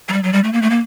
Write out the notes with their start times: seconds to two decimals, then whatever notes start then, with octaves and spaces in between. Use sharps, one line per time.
0.09 F#3
0.13 G3
0.23 F#3
0.33 G3
0.44 A3
0.53 A#3
0.62 A3
0.70 A#3